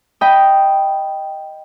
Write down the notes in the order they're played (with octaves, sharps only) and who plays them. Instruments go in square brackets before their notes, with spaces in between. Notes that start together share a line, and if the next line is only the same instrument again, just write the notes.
[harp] D#5 G5 B5